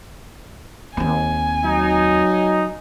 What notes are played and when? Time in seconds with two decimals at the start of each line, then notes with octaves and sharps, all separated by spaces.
0.97 D#2 C4 G#5
1.64 F#3 D#4